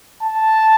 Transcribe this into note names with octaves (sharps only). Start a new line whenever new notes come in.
A5